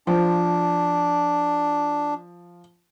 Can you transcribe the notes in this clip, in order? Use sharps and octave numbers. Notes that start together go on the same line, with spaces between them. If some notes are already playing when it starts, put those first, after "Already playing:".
F3 D4